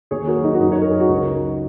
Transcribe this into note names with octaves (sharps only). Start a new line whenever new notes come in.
D#2 G#4 C#5
F#4 A#4
F#3
D#4 G#4
F#4
F#2 D#4
C#5
F#3 A#4
G#4
F#4
C#2 D#4
F#3